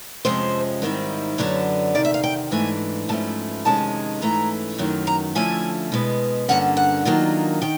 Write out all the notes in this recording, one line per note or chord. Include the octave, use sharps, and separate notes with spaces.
F2 C3 F3 G#3 C#4 C5
G#2 D#3 G3 C4 E4
F#2 D3 F#3 B3 D4 C#5
E2 C3 D#3 D5
E5
F5
G5
G#2 E3 A3 D4 G#5
G#2 F3 A3 C#4 E4 A5
F2 C3 D#3 G#3 C#4 A5
G#2 E3 A3 C#4 A#5
F#2 D#3 F#3 A3
A#5
D3 F3 A3 C#4 E4 G#5
B2 G#3 B3
G2 D3 F3 A#3 C#4 F#5
F#5
D#3 F#3 A#3 D4 F4
D#3 G5